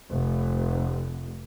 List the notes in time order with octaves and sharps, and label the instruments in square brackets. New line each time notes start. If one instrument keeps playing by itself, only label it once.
[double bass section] F1